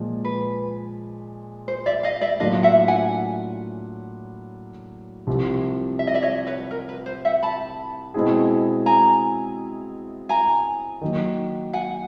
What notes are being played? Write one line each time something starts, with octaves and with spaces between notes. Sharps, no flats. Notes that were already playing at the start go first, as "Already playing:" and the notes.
Already playing: A#2 F3 G#3
B4
C5
D5 E5
D#5 F5
D5 E5
A2 F#3 A#3 D4 F4 D#5 F5
E5 F#5
F#5 G#5
C2 C3 F3
E5
D#5
D5 E5
C#5 D#5
B4 C#5
A#4
B4
C5
E5 F#5
A5 B5
B2 G#3 C4 E4 G#4
G#5 A#5
G#5 A#5
D#3 F#3 A#3
F#5 G#5